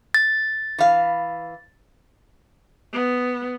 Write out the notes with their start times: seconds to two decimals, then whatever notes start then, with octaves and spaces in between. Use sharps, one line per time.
0.14 A6
0.78 E3 F5
2.93 B3